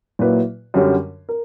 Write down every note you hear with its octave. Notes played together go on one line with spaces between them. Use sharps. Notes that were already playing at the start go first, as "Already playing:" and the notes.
A#2 F#3 A#3 E4 B4
F#2 D3 G3 C#4
A#4